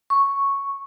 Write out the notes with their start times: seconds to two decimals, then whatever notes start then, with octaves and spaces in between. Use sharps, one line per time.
0.10 C#6